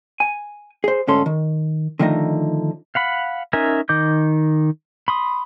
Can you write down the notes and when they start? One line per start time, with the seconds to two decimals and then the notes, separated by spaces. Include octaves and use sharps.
0.20 G#5
0.84 G#4 C5
1.07 D2 G#2 C#4 A4 C6
1.26 D#3
1.99 D3 D#3 F3 A3 D#4 A#5
2.95 F5 F#5 B5
3.53 C#4 D#4 A#4 E5 G#5
3.89 D#3 D#5 D6 G6
5.08 B5 C6 D#6